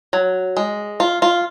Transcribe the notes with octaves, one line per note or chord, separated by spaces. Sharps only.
F#3
G#3
F4
F4